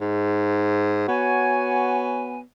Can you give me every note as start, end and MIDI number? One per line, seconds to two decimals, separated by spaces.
0.01 1.05 44
1.08 2.42 59
1.08 2.39 66
1.08 2.39 73
1.08 2.39 80